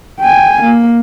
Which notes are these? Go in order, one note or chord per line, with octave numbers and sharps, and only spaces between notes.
G5 G#5
A#3